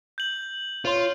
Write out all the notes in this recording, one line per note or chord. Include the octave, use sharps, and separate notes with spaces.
G6 F#7
F4 C#5 C6